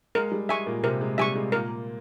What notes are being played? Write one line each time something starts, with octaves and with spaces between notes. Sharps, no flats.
G#3 A#4
G3
G#3 E5 G#5 C#6
A#2 A#3
C3 C4 A#4
G#3
G3 E5 G#5 C#6
G#3
A#2 A#3 A#4